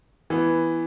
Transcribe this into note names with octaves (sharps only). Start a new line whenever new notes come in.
E3 B3